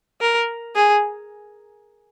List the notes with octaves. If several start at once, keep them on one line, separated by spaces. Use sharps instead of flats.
A#4
G#4